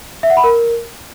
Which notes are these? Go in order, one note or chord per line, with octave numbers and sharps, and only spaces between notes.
E5
F#5
B5
A#4